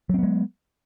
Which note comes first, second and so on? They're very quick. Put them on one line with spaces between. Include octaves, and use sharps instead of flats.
F#3 C4 B3 G#3